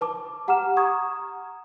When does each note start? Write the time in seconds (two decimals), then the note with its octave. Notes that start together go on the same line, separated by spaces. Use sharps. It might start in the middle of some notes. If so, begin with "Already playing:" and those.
0.01 B4 A5 D6
0.48 G4 F#5 A#5 D6 F6 E7
0.77 A#5 C#6 D#6 G#6